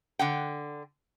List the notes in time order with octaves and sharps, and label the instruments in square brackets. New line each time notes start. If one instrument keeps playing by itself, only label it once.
[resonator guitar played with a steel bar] D3 F#5 G5